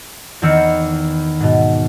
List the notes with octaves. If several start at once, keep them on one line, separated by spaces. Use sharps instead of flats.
E2 D#3 C4 E6 C#7
G#2 B2